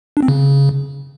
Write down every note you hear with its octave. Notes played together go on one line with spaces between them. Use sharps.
D4
C4
C#3